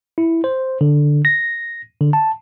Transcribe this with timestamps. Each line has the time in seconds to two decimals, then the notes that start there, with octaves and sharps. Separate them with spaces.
0.18 E4
0.44 C5
0.81 D3
1.25 A#6
2.01 D3
2.13 A5